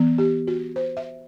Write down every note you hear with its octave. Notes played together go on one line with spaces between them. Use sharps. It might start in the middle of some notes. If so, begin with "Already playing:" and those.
Already playing: E3 B3
G4
F#4
C5
E5